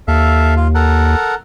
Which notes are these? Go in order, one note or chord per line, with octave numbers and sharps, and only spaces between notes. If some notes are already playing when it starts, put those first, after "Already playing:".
D#2 A4 E5 F5
F4
A4 A#4 F#5